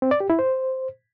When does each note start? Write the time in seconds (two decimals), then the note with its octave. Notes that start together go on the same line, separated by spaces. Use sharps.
0.02 C4
0.11 D5
0.20 G4
0.30 E4
0.39 C5